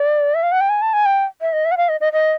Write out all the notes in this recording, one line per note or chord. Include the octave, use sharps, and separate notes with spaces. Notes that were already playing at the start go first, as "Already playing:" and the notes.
Already playing: D5
E5
F5
F#5
G5
G#5
A5
G#5
G5
E5
D#5
E5
F#5
F5
D#5
D#5
D#5